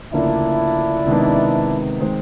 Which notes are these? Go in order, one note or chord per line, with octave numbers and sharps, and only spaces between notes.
D2 C#3 F3 A#3 D4 E4
C3 D#3 G#3 B3 D#4
D#3 G#3 C4